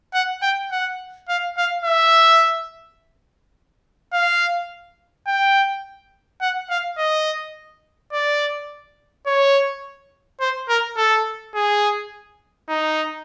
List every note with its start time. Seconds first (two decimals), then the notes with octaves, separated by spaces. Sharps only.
0.14 F#5
0.42 G5
0.72 F#5
1.29 F5
1.57 F5
1.85 E5
4.13 F5
5.27 G5
6.42 F#5
6.70 F5
6.98 D#5
8.13 D5
9.27 C#5
10.41 C5
10.69 A#4
10.97 A4
11.55 G#4
12.69 D#4